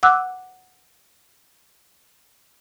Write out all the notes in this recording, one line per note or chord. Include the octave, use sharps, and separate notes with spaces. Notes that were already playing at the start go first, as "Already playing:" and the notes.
F#5 D6 E6 F#6